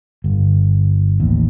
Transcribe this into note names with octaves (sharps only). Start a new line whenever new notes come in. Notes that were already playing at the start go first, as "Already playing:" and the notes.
G1
A1 D#2